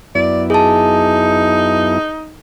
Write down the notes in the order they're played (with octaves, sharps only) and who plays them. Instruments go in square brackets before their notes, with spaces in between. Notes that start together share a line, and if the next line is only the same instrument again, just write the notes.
[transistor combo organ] F#2 B3 E4 [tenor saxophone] D5
[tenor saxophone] D#4 [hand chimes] G#4 A5